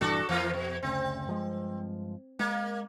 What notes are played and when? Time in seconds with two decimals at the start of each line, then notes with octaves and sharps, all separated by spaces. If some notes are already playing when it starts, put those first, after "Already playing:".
0.01 A#1 G2 E3 D4 F#4 A4
0.29 F2 E3 A#3 F4
0.53 B2
0.83 F#1 D2 C#3 C4
1.27 G2 F3 G#3
2.39 G#3 A#3